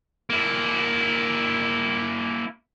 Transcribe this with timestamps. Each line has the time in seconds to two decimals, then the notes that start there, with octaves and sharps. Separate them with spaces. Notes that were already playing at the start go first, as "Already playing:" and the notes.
0.30 A#3 E4